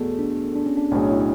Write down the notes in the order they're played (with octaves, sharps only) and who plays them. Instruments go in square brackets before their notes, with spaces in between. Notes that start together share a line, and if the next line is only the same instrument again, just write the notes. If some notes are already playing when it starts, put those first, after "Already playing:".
Already playing: [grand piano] E2 B2 A3 [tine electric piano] B3 F#4 G#4 A4
[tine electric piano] D4
D4
C#4
D4
[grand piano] B1 A2 F#3 C#4 G#4 [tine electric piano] D4
[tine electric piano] E4